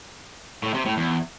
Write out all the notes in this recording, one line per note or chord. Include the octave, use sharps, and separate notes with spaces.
A2
C3
A2
E2